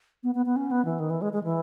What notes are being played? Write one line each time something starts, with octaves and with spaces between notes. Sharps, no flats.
B3
B3
B3
C#4
B3
E3
D#3
E3
G#3
G#3
E3